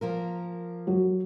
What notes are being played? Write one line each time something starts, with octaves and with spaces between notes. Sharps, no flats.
F3 A#3 A#4
F#3